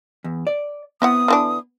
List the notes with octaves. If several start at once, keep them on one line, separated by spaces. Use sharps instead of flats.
E2
D5
B3 C4 E4 F#5 D#6
D3 E3 D4